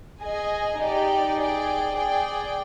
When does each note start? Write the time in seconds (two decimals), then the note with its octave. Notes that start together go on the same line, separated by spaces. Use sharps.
0.21 G#4 D#5 G#5
0.80 D#4 G4 D5 G5
1.37 G#4 D5 G5
1.95 G#4 D5 G5